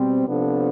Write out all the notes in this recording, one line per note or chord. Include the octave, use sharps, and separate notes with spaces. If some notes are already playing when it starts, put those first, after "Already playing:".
Already playing: B2 G3 C4
C3 F3 B3 D4 A4